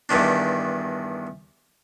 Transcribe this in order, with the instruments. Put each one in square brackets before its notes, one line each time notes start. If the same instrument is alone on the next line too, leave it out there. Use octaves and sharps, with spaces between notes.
[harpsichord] E2 G2 D#3 D4